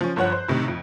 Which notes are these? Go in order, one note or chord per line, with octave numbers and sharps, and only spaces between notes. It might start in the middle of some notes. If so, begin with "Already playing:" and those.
F3 C#4
G1 F3 C#5 F#5 F#6
C5
A2 C3 D#3 D#4
F2